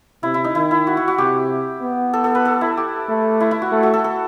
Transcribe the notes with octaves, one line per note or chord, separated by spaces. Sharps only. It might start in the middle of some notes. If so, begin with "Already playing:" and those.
C3 E4
E4
D#4
D#3 E4
E4
F#4
F#4
F#4
C3 G4
B3
A4
A4
B4
A4
E4
G4
A3
E4
E4
F#4
A3
F#4
A4
A4